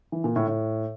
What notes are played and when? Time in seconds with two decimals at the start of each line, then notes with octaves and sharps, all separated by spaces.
0.12 E3
0.24 A#2
0.36 A2
0.48 A2